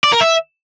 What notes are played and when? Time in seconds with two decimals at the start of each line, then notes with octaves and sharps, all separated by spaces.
0.04 D5
0.12 A#4
0.21 E5